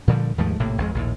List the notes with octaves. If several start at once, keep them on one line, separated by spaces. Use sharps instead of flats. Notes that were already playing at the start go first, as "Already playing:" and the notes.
A#2 D3 F3 G3
D#2 G#2 F3 A3
A#1 A2 C3 A#3
G#1 F2 G#3
A#1 D#2 A2